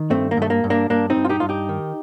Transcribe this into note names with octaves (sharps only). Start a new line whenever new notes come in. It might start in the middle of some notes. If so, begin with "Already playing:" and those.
Already playing: D#3
G2 A3 C4
A#3
G2 A3
A#3
G2
A#3 D4
G2 A#3 D4
C4 D#4
G2
F4
D#4 G4
G2 F4
D#4 G4
D#3